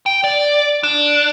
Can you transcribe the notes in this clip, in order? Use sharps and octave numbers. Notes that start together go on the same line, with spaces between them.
G5
D5
D4